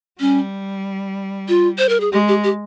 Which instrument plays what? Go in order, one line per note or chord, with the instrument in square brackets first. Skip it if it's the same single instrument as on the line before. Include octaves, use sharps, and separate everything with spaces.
[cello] G3 [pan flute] C#4
[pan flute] F4
C5
A#4
G#4
[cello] G#3 [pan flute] G4
[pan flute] G4
G4